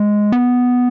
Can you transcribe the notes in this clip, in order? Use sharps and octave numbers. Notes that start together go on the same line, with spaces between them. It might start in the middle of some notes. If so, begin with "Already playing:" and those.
Already playing: G#3
B3